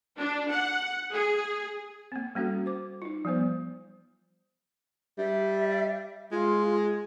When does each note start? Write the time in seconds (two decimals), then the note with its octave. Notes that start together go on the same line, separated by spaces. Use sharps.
0.17 D4
0.49 F#5
1.13 G#4
2.12 A#3 C4
2.35 G3 A#3 C#4 F#4 A4
2.66 C5 D6
3.02 D#4 F4
3.25 F3 G3 B3 C5
5.18 G3 E5
6.32 G#3 F4